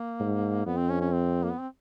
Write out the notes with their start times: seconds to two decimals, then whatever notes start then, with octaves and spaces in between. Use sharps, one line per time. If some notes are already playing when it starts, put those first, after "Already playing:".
Already playing: A#3
0.20 G#2
0.66 F2 B3
0.77 C4
0.89 C#4
1.01 C#4
1.12 C4
1.44 A#3
1.51 B3
1.60 C4